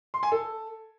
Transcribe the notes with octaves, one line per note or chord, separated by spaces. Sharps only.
C6
G#5
A4